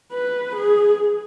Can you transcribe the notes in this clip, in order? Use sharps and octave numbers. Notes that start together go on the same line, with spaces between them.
B4
G#4